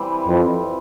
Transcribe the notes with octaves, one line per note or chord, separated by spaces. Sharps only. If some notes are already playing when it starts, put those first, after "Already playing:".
Already playing: E3 G3 C4
F2